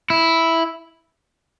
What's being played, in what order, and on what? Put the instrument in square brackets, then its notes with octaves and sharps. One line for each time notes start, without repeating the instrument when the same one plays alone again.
[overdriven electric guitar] E4